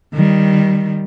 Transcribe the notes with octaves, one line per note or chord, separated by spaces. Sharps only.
D#3 G3